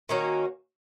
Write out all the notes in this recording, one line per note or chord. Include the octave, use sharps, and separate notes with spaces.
D#3 A#3 C#4 F#4